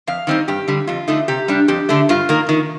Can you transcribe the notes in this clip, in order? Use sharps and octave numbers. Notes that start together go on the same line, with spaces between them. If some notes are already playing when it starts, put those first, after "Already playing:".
F2 F5
D#3 G3 C4 D#4
G2 G4
D3 G3
F2 F4
D3 A3 D#4
C3 G4
G3 D4
F2 G4
D3 A3 D4
G2 F4
D#3 A#3
D#3